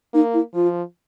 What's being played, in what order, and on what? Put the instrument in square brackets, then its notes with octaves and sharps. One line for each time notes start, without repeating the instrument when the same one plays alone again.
[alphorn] A#3 [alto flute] D#4
[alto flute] E4
[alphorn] F3 [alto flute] F4